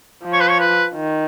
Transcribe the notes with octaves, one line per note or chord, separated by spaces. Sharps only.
F3
C#5
B4
C#5
B4
D#3